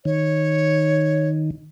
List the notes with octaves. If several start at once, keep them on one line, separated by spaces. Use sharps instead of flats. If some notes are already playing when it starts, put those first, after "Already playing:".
D#3 C#5